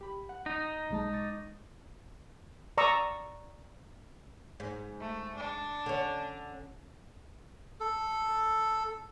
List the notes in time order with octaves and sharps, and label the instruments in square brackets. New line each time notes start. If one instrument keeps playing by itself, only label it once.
[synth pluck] G4 B5
F#5
[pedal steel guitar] D#4
[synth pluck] B1 G#3 A5
C#6 D6 A6
[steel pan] D5 A#5 C#6 D#6 E6
[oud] G#2
[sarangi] A3
D4
[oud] D3 C#4
[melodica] A4